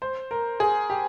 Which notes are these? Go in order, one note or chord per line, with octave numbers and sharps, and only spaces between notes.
C5
A#4
G#4
G4